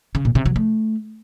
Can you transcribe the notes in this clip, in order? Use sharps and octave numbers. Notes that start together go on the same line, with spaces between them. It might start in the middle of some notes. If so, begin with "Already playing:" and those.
C#3
A#2
C3
F#3
A3